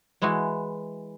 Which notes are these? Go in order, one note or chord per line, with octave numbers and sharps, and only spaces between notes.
E3 G#3 E4 F#4